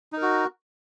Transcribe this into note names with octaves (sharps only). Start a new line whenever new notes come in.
D#4 F#4 A#4